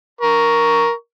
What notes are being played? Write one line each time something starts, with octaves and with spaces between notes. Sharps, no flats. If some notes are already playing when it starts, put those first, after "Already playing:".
A#4 C#6